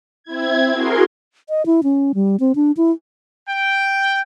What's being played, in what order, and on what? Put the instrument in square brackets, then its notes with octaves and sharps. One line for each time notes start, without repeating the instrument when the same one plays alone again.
[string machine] C4 E4 G#6
F#4 G#4 A#4 C6
[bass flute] D#5
E4
C#4
G3
C4
D4
E4
[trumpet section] G5